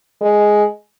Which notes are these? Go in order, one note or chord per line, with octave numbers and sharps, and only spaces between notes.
G#3